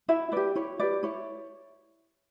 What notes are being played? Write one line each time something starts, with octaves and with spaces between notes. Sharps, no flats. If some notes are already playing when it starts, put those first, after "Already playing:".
E4 E5
G4 B4 D5
E4 C#5
G4 B4 D5
E4 C#5